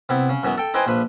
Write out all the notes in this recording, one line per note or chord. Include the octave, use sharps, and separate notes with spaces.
C3 B3 E4
C#3
F#2 E3 F#3 B3
A4 G5
D#4 E4 B4 C5 G5 G#5
A#1 F3 B4